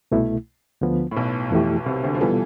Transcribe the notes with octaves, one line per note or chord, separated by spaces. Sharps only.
C2 B2 A3 E4
D2 D3 F3 B3
A2
B1 B2
F2 E3 A3 E4 G4
C2 C3
D2 D3
F3
B2 E3 G3 B3 F4 A4